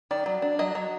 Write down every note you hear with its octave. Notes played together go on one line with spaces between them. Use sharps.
D#3 D5
F#3
D4
F#3 D#5
F#3